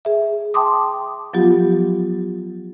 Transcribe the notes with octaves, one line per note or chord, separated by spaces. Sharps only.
G#4 E5
G5 A5 C6 D6 D#6
F3 F#3 B3 F4 G4